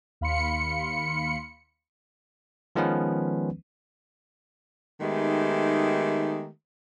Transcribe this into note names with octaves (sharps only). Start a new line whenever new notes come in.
D#2 F5 B5 C6 C#7
D#3 F3 G#3 B3 C#4 B4
D#3 G#3 A3 B3 D#4 G4